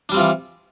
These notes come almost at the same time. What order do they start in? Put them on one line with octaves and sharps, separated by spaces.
D4 G3 C4 F4 E3